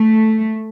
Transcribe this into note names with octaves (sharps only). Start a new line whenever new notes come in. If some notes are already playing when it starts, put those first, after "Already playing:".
Already playing: A3